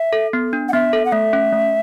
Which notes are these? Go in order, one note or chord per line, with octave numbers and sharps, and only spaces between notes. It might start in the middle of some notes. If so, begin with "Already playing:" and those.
Already playing: E5
A4
B3
D4
F#5
B3 E5
A4
F#5
A3 E5
C#4
A3